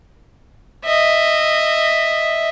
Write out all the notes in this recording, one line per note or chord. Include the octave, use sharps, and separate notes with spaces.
D#5 E5